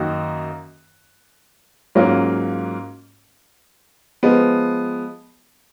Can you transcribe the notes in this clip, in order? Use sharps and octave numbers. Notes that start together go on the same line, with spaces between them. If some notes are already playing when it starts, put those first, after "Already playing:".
Already playing: F#2 D#3 A#3 D#4 F#4
G#2 F#3 A#3 C#4 F4
F3 G#3 B3